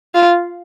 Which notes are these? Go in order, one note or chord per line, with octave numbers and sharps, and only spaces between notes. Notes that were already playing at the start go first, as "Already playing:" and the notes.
F4